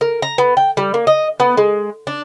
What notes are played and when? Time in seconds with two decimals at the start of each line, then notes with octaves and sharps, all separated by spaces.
0.01 A#4
0.22 A#5
0.38 B3
0.57 G5
0.77 G3
0.94 A#3
1.07 D#5
1.40 B3
1.57 G#3
2.07 D4